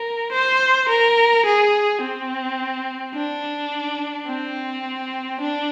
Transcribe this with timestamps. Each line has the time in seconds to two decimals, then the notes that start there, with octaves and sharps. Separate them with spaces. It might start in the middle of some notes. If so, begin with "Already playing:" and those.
Already playing: A#4
0.32 C5
0.89 A#4
1.45 G#4
2.02 C4
3.15 D4
4.27 C4
5.41 D4